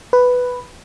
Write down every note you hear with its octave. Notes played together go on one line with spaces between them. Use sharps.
B4